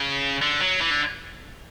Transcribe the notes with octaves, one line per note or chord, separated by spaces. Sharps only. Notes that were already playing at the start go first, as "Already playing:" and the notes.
Already playing: C#3
D3
F#3
E3
D3